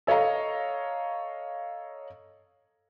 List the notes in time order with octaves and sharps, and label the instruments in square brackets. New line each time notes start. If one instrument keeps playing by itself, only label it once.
[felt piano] A4 C#5 D#5 F5 A#5